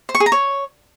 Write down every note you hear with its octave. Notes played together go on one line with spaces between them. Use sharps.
C5
C#6
G#4
A#5
C#5